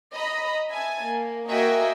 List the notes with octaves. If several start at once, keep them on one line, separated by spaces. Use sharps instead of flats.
D#5 A#5 B5
E5 G#5 A5
A#3
A#3 F#4 D#5 E5 G5 G#5